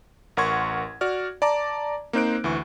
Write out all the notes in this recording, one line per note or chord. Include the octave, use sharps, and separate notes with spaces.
A1 A#4 F#5 C6 C#6 G#6
F#4 D5 F6
D5 A5 A#5 D6
A#3 C4 D#4 C5 F#6 D7
D2 E3 C#6